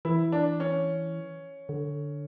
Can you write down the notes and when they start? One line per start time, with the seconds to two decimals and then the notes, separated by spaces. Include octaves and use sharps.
0.05 E3 E4
0.32 D4
0.60 C#4
1.69 D3